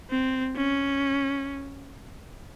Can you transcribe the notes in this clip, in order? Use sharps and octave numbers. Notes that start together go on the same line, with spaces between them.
C4
C#4